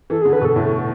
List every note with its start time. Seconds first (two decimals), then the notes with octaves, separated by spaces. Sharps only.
0.10 E3 A4
0.22 D3 G#4
0.33 B4
0.41 B2
0.45 A4
0.56 A2